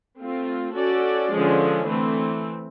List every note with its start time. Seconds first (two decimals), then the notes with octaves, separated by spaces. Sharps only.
0.21 A3 C4 F4
0.77 C#4 F#4 A4 D5
1.33 D3 F3 G#3 C#4
1.89 E3 A3 C4